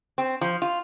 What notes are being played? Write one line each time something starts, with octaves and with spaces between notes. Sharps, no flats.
C4
F3
F4